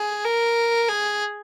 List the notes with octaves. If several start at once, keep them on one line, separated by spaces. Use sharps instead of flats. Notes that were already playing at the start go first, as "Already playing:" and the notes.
Already playing: G#4
A#4
G#4